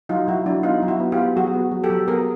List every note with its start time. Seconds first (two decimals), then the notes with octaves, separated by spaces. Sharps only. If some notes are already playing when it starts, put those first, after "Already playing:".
0.09 F#3 D#4 F4
0.28 F#3 E4 F#4
0.46 F#3 D4 E4
0.63 B3 D#4 F4
0.82 F#3
0.88 E4 F#4
1.00 B3
1.12 F4 G4
1.18 B3
1.36 F#3 F#4 G#4
1.54 B3
1.72 F#3
1.84 G4 A4
1.90 F#3
2.08 B3 G#4 A#4